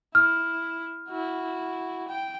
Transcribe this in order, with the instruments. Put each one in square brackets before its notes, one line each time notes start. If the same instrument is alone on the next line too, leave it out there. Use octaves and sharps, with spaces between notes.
[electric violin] E4 [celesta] F6
[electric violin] E4 F#4
G5